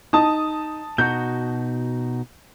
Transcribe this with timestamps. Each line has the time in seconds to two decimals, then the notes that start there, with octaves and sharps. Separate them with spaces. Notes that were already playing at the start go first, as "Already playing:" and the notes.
0.13 D#4 A5 D#6
0.98 B2 D#4 F#4 G6